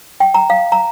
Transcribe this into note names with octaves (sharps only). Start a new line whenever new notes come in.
G5
A#5
F5
A#5